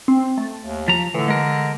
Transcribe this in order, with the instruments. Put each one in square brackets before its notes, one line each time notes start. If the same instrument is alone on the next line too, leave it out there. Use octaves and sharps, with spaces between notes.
[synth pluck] C4
A3
[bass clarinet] D#2
[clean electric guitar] F3 A#5
[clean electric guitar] A2 [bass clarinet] D3 [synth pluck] E3
[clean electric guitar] G#3 A#4